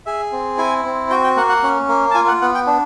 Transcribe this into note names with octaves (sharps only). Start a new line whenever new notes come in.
G#4 E5
C4
E4 G#5
C4
F#4 G5
G5
A#3 F#5
F#5
C#4
A#3
A5
F4 G#5
F#5
B3 F#5
G5
D4